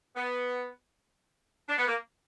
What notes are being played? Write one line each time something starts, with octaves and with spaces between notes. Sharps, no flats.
B3
D4
B3
A#3